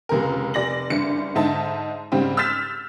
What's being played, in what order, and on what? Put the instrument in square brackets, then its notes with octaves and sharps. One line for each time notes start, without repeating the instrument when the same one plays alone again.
[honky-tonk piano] F1 C#2 A#4
F1 D5 A#6 F#7
F#1 G2 D5 C#7
G#2 D3 D#4 E5 A5
G#2 C#3 G3 C4
E6 F6 G6 A6 B6 E7